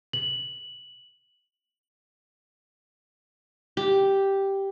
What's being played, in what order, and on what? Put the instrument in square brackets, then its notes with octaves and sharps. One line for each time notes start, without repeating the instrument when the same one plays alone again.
[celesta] F#7
[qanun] G4